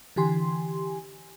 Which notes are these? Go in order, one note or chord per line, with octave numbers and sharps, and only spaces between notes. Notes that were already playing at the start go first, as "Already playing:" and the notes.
D3 E3 G4 G#5 C6